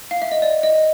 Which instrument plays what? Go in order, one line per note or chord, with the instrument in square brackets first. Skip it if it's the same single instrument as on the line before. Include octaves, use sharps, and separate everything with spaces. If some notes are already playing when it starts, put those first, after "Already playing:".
[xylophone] F5
E5
D#5
D5
D#5